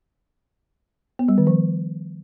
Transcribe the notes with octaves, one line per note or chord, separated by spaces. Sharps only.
B3
G3
D#3
F3